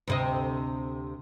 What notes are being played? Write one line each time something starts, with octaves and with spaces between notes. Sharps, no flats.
D2 C3 D#5